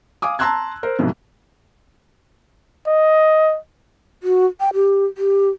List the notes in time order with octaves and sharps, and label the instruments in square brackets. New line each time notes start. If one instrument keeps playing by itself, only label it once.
[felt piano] F5 G#5 D6 D#6
A5 A#5 C6 E6 F#6 G#6
A#4 C5
C2 F2 G#2 B2 F#3
[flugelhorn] D#5
[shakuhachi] F#4
G5
G4
G4